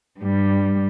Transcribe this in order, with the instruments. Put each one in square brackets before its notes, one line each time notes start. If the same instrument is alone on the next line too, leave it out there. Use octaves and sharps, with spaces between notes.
[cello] G2 G3